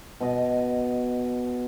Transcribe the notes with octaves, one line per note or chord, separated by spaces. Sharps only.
B2 D#5 A5